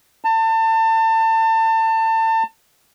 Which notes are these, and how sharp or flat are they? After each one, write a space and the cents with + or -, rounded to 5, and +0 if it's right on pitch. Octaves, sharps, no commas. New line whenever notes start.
A5 +30